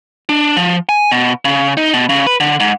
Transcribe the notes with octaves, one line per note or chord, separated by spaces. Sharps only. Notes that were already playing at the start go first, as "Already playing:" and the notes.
D4
F3
G#5
B2
C#3
D#4
B2
C#3
B4
D3
G#2